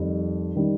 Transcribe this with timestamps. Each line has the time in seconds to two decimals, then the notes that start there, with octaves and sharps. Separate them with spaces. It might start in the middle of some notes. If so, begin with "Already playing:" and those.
Already playing: F2 D#3 G3
0.56 D#3 G3 D4